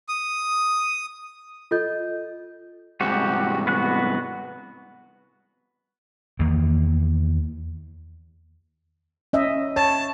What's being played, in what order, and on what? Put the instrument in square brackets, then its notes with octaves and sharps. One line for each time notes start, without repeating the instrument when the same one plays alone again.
[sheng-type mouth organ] D#6
[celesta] F4 A4 D#5 G6
[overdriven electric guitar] C2 G#2 [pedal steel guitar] F#4 G4
[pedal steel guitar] B3 F#4 F#6
[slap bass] E2 D#3 A#3
[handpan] C#4 D#5 E5
[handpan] C#5 [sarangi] A5